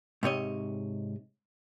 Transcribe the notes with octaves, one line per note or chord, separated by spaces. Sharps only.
G#2 C3 C#5 D#5